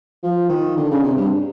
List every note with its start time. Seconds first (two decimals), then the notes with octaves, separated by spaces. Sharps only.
0.23 F3
0.49 D#3
0.77 D3
0.91 C#3
1.04 C3
1.17 G2